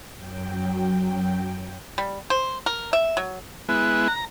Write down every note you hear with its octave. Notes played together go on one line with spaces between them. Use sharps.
F#2 F#3 G5
G3
C5
A#4
E5
F#3
G#3 B3 E4 F#6
A#5